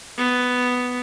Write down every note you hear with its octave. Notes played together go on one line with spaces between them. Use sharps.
B3